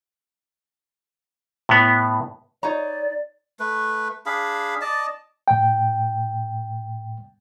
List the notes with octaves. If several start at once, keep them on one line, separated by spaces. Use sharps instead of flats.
A2 B3
D#4 C#5 D5 A#5
A3 B4
D4 G#4 F5 B5
D5 D#5 A5
A2 G5